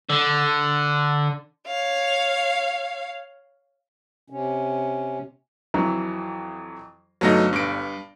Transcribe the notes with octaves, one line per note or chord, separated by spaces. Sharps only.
D3
C#5 F5
C3 C#4
F2 E3 F#3
G1 F#3 A3 D#4 A#6
G2 D7